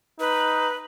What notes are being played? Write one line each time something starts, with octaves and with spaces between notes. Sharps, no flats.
D#4 B4